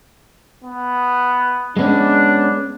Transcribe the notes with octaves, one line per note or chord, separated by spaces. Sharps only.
B3
G#3 B3 C#4 D4